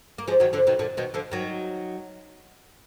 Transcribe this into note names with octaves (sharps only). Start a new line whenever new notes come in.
A#3
F3 G#3
D#3 F#3
D3 F3
B2 D#3
A#2 D3
B2 D#3
D3 F3
D#3 F#3